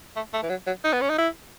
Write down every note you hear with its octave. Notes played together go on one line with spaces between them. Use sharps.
A3
A3
E3
F#3
F#3
D#4
B3
C#4
D#4
E4